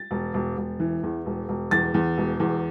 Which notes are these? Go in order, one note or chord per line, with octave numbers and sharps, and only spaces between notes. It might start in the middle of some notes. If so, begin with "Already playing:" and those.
Already playing: A6
E1
E1
E1
E3
E2
E1
E1
E2 A6
E2
E1
E2